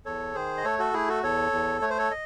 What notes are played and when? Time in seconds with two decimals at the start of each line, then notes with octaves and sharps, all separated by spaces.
0.05 E2 A4 C#5
0.34 D#3 G#4 C5
0.57 D#5
0.64 A3 A4 C#5
0.79 F#4 A4
0.94 A3 E4 G#4
1.09 F#4 A4
1.23 E2 A4 C#5
1.52 E2
1.81 A3 C#5
1.90 C5
1.98 A4 C#5
2.11 D#5